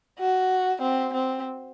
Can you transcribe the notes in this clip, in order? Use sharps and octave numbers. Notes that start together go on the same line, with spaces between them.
F#4
C4
C4